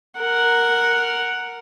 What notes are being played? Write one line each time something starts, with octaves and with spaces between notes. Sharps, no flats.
A#4 F#5